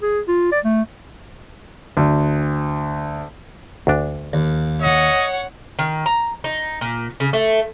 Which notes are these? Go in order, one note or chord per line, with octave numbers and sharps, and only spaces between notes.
G#4
F4
D5
A3
D2
D2 D4
D#2
C#5 D#5 F#5
D#3
A#5
D#4
A#2
C#3
A3